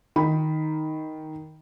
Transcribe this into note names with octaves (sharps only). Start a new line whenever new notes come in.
D#3 B5